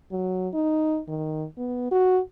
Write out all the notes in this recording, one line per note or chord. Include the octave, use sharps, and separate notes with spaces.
F#3
D#4
D#3
B3
F#4